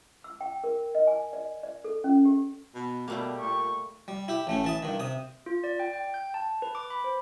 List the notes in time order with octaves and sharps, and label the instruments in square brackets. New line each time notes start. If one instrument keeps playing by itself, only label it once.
[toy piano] E6
G5
A#4
D#5
G#5
D5
D5
A4
C#4
G4
[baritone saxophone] B2
[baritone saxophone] B2 [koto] G3 A3 A#3 [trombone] G4
[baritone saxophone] A#2 [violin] C#6
[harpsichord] G3
E4 G4
A1 A3 C#4
E3 A5 D#6
G2 D#3
C3 D#6
[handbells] F4
D5
G5
G5
G6
A5
B4
D6
B5
C5